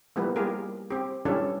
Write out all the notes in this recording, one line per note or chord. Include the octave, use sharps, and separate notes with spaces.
F3 G3 A#3 B3 E4 B4
G3 A#3 F4 G4 G#4 A#4
C4 G4
E3 G3 C#4 D4 F4 A4